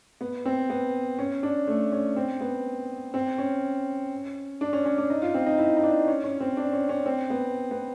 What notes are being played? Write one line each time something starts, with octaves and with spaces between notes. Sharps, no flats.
B3
C4
B3
C#4
D4
A3
C#4
C4
B3
C4
C#4
D4
C#4
C#4
D4
D#4
F4
C4
D#4
E4
D#4
D4
C#4
C#4
C4
D4
C#4
C#4
C4
B3
B3